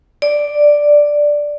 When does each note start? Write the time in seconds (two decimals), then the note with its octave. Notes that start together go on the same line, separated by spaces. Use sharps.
0.22 D5